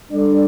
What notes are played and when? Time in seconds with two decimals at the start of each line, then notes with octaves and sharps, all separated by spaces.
0.12 G3 D4 A4 D5